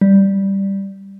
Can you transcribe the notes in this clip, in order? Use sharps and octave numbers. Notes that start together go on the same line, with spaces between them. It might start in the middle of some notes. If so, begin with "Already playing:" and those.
G3